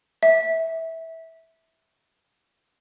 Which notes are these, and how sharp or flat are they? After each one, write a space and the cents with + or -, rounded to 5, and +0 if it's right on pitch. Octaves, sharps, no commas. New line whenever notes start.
E5 -15